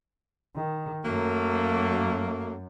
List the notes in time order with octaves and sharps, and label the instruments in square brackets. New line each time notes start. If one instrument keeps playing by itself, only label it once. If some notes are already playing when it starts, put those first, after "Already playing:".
[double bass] D#3
[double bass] F#2 [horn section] F#3 A3 A#3